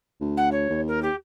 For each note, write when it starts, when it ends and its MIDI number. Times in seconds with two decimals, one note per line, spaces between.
0.20 0.69 38
0.37 0.49 78
0.51 0.81 73
0.69 1.09 39
0.87 1.02 70
1.02 1.15 67